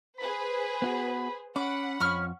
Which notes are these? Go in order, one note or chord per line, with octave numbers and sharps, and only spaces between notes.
G#4 B4 C5 B5
B3 F4 F#4
C#4 F#5 B5 D6
F2 C#4 C#6 F6